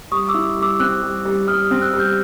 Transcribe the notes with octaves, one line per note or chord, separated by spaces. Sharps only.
G3 C#6 D#6
D6 E6
E4
G3
D6 E6
C4 E6 F#6
G3
G3
G3 D#6 F6
D#6 F6
C4
E6 F#6
G3
F6 G6